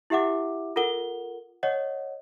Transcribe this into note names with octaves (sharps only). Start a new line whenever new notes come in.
E4 G4 E5 F#5 D6
F4 A4 A#4 F#5 G7
C#5 D#5 F#5